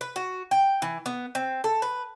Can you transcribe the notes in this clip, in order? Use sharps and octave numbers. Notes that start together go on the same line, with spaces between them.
B4
F#4
G5
E3
B3
C4
A4
B4